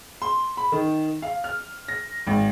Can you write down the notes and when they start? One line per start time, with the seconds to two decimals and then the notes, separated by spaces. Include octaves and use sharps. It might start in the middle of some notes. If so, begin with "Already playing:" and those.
0.22 C6
0.57 B5
0.72 D#3
1.22 F5
1.44 F6
1.88 A#6
2.27 G#1